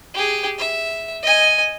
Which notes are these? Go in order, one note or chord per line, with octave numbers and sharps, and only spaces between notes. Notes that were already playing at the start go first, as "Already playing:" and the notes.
G4 G#4
E5
D#5 G#5